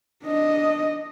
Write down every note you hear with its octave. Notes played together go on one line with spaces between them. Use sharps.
D4 D#5